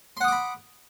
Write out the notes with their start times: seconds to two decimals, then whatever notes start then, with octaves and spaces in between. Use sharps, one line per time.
0.17 C6
0.21 F#5
0.24 D#6
0.28 D6
0.32 B5